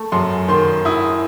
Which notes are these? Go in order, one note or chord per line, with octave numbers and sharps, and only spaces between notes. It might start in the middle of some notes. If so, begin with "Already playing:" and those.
Already playing: A3
F#2 C6
D#3 C6
E4 D#6